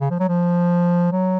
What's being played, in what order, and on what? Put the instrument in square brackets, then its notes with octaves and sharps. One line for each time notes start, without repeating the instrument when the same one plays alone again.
[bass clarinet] C#3
F3
F#3
F3
F#3